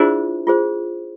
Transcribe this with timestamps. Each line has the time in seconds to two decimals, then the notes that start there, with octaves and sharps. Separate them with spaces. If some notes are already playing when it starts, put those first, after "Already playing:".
Already playing: D4 E4 F4 G#4 C5
0.47 F4 G#4 C5